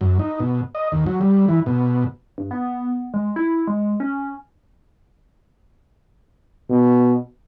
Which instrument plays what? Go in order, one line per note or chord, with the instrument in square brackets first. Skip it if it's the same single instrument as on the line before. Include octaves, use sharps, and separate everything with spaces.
[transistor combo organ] F#2
D#4
B2
D#5
D#2
F#3
G3
E3
B2
[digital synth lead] G2
B3
G#3
E4
G#3
C#4
[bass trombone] B2